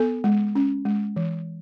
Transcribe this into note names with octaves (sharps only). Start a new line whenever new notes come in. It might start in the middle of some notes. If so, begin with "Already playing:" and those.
Already playing: B3 A4
G#3
C#4
G#3
E3